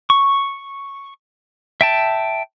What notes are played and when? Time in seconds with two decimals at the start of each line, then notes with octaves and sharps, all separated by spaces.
0.10 C#6
1.81 E5 G5 A5